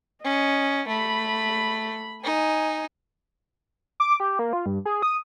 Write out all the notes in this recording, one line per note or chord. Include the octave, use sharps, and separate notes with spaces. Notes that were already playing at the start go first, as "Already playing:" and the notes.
C#4 D#5
A3 B5
D#4 G#5
D6
G4
A#3
F4
G2
G#4
D#6